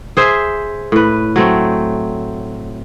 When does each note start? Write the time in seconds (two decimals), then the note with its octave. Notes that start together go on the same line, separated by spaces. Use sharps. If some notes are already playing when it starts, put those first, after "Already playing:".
0.17 G#4 C5 E5
0.92 A2 B4
1.36 F#3 A3 C4